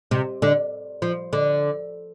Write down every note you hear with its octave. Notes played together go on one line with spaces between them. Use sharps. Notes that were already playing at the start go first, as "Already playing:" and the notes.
C3
D3
F3
D3